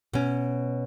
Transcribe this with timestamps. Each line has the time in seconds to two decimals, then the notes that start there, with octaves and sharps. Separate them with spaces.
0.13 B2 C#4